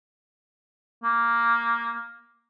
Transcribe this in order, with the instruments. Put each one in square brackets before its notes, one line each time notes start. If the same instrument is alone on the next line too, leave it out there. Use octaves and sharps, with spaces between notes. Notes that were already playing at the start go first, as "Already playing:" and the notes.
[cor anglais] A#3